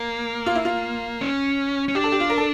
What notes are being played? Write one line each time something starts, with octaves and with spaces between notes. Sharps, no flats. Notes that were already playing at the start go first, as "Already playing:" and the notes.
Already playing: A#3
F4
E4
F4
C#4
C#4
D4 G4
A4
G4
F4
A#4
A4